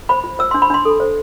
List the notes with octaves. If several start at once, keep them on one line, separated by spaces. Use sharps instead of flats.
C5 B5
F4
C5 E6
C6
D4
B5
D4 C6
A4
C5